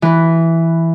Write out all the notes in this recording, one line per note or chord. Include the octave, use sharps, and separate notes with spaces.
E3 B4